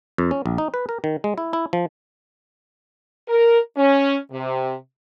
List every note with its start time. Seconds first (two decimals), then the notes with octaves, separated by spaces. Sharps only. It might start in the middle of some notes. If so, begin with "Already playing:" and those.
0.18 F2
0.31 C#4
0.46 A#1
0.58 D#4
0.74 B4
0.89 A#4
1.04 D#3
1.24 G#3
1.38 E4
1.53 E4
1.73 F3
3.29 A#4
3.77 C#4
4.32 C3